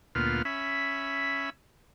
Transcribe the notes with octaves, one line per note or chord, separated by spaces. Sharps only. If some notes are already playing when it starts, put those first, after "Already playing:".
D2 A#2 B3 F4 F6
C#4 E5 B5